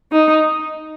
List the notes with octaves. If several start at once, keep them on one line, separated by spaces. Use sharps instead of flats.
D#4